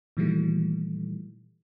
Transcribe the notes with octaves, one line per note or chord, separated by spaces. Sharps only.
A#2 D#3 E3 F#3 G3 A3